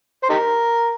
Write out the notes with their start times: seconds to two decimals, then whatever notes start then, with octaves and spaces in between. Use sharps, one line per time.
0.23 C5
0.29 D#4 G4 A#4